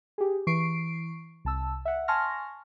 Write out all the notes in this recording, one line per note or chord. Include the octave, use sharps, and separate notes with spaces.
G4 G#4
E3 C#6 C7 D7
C2 A5 E6
E5 F#5
G#5 A5 C6 C#6 F6 A#6